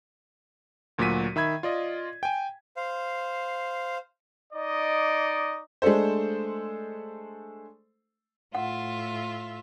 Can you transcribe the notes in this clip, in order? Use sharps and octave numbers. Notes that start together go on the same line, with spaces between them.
D2 A#2 F#3 F#4 B6 D#7
D#3 E5 B5 G#6
F4 D5 D#5
G5 G#5
C5 F5
D#4 D5 D#5
G#3 A3 D4 A4 C5
A2 F4 E5 F#5